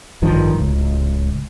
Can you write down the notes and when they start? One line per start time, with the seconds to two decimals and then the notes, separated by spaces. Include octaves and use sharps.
0.22 A1 G2 D#3 F3
0.57 D1 C#2